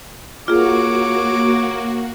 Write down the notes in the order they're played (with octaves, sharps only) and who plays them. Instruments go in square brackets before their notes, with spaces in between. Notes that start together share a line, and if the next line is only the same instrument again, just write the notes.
[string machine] A#3 F#4 [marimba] F4 G#4 [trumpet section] C#5 D6